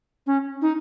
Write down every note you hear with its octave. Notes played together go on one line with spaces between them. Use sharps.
C#4
D#4